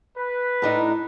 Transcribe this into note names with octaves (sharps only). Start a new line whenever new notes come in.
B4
A2 D4 D#4